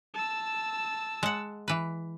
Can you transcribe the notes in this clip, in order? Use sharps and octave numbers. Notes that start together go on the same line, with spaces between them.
A5 E6
G#3 F#5
E3 B4